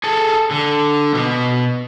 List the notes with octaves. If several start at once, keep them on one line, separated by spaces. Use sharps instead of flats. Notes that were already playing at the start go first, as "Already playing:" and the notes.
G#4 A4
D3
B2 B3